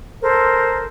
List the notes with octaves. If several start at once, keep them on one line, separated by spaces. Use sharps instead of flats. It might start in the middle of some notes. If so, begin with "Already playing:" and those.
A4 A#4 C5